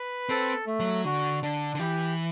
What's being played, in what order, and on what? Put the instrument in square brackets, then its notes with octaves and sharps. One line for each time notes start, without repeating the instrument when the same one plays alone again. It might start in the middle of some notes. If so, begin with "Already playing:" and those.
Already playing: [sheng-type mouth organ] B4
[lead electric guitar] C4 [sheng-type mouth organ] A4
[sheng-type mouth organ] A3
[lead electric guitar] F#3
[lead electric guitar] D3 [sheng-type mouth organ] F#4
[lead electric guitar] D3 [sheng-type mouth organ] D4
[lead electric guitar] D3
[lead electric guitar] E3 [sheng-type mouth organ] G4